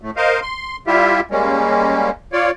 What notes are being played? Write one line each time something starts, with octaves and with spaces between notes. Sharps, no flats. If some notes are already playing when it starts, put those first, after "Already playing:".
A2 A3
A#4 C5 D#5 F5
C6
G3 E4 F4 G4 E5
G3 G#3 A#3 C#4
F4 C#5 D5